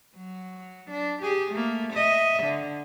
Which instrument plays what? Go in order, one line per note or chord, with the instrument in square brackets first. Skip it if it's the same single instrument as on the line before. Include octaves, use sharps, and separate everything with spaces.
[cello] F#3
D4
G4 G#4
A3 A#3
D#5 E5
D3